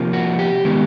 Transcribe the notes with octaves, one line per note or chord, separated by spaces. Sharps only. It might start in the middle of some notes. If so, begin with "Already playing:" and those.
Already playing: C3 F3 A#3
F#4
G4
D#3 G#3 B3